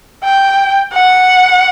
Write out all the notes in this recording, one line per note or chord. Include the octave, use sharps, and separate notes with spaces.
G5
F#5